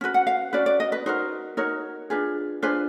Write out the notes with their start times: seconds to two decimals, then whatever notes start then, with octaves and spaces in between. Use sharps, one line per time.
0.01 C#4 F#4 B4
0.14 F#5
0.27 F5
0.53 C#4 F#4 B4 D5
0.66 D5
0.80 D#5
0.92 B4
1.06 D#4 F#4 A#4 C5
1.57 D#4 F#4 A#4 C#5
2.10 D4 F4 G#4 B4
2.62 D4 F4 G#4 B4 C5